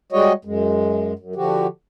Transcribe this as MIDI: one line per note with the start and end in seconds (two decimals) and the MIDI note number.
0.12 0.33 55
0.12 0.33 56
0.12 0.33 66
0.12 0.33 73
0.12 0.33 75
0.45 1.13 42
0.45 1.13 56
1.19 1.34 42
1.36 1.67 50
1.36 1.67 53
1.36 1.67 66
1.36 1.67 67